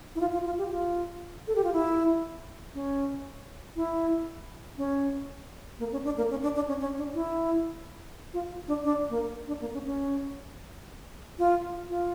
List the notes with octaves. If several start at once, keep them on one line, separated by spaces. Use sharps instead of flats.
E4
F4
F4
F4
G4
F4
A4
G4
F4
E4
C#4
E4
C#4
A#3
C#4
D4
A#3
C#4
D4
D4
C#4
C#4
D4
E4
F4
D4
D4
A#3
D4
A#3
C#4
C#4
F4
F4